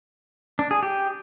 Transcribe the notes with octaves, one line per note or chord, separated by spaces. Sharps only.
D4
G#4
G4